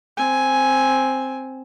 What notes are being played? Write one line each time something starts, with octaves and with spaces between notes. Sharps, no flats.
C4 G#5